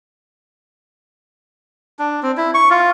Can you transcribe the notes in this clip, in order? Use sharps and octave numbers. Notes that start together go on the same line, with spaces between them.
D4
C4
E4
C#6
F4